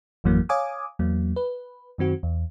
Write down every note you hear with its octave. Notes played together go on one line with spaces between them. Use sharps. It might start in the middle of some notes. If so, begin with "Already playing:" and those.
G#1 F2 E3 F#3 A#3
C#5 F5 G#5 D6 D#6
E2 F#3 A#3
B4
F#2 D#3 C4 F#4
E2